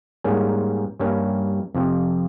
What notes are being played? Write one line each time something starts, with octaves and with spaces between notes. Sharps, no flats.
G#2 G3 A#3 C#4 G#4
G2 G3 A#3 C#4
F2 C3 F3